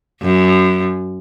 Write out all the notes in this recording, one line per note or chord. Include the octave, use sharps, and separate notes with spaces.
F#2